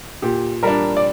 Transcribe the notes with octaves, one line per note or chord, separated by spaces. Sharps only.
A#2 G4
G3 D4 A#4
D5